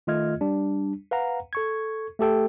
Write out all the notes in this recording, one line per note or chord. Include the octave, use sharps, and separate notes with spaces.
D#3 A3 F4 D#5 F6 G#6
G3 D4
B4 F5 F#5 A#5
A4 C#6 G#6
A3 G4 A4 G5